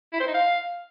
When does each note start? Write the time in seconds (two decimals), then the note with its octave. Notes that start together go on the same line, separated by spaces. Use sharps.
0.13 E4
0.20 C5
0.27 D#4
0.34 F5